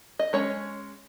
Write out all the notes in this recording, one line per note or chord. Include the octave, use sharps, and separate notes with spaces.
D#5
G#3 C#4 C#5